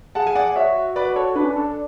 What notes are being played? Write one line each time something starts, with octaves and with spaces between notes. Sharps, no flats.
G#4 F#5 A5
G#5
D5 F#5
F#4 C#5 E5
B4 D5
A4 C#5
D4 B4
C#4
D4 A4